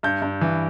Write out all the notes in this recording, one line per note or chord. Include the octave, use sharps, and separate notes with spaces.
G2 G6
G2
E3